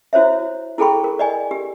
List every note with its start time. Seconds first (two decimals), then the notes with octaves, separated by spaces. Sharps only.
0.13 E4 F#4 C5 C#5 E5
0.78 E4 G#4 A4 G5 B5 C#6
1.04 A#4
1.19 D5 D#5 G#5
1.51 G4